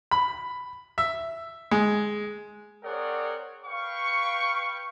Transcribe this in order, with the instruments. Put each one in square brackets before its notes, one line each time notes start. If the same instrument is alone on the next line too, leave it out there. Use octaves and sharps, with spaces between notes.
[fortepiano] B5
E5
G#3
[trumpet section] C4 G#4 A#4 C#5 D5 F#5
B4 F5 G5 C#6